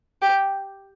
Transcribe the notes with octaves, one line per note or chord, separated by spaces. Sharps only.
G4